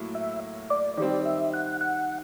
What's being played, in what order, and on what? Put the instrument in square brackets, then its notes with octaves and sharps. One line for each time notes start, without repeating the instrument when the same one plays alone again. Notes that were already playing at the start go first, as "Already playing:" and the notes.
Already playing: [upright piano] A2 F#3 A#3 E4
[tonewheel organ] E5
D5
[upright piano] D#3 G3 C4 [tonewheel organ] D5
[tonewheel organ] E5
F#5
F#5